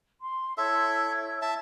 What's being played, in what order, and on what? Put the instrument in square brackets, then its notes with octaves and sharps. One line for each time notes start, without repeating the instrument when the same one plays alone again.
[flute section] C6
[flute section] E4 C#5 [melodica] A4 E5
[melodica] E5 A5